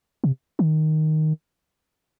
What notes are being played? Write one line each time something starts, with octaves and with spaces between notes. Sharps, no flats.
C3
D#3